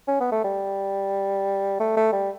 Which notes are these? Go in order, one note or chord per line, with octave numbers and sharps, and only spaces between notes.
C#4
B3
A3
G3
A3
A3
G3